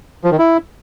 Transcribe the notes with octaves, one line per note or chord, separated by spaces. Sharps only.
F3
D#3
E4